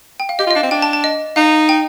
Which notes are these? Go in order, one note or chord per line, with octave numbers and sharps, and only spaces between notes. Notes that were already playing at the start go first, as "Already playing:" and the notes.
G5
F5
G4 D#5
F4
D#5
D4 F5
C4
D4 G5
A5
A5
D#5
D#4 F5
G5